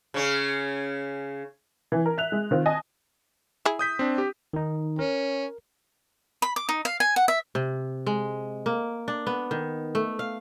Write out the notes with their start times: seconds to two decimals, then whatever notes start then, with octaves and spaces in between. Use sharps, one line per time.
0.14 C#3 C#4
1.92 E3
2.06 A#4
2.18 E5 F#6 F7
2.32 G#3
2.51 D#3 C4 F4
2.66 D#5 G#5 A5
3.65 E4 G#4
3.79 D#6 G6 B6
3.99 C4 D4
4.18 G4
4.53 D#3 D#4
4.99 C#4 A#4
6.42 B5
6.56 D6
6.69 D#4
6.85 F5
7.00 G#5
7.16 F#5
7.28 E5
7.55 C3
8.06 G#3
8.66 A#3
9.08 D4
9.27 B3
9.51 D#3
9.95 A3
10.19 F5